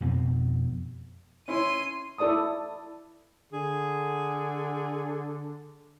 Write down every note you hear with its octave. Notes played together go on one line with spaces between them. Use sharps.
F2 B2 C4
C#4 E4 C6 D#7
E4 A4 D5 A5 D#6
D3 G#4